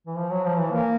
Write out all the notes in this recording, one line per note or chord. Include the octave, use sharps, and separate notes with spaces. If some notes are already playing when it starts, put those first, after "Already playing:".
E3
F3
F#3
F3
E3
A#3